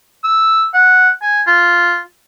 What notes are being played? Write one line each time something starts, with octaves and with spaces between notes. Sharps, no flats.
E6
F#5
G#5
F4